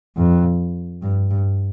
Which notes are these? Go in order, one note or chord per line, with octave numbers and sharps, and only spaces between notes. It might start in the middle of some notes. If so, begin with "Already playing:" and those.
F2
G2
G2